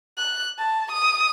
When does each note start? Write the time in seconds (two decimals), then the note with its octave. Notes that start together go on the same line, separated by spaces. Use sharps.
0.18 F#6
0.59 A5
0.92 D#6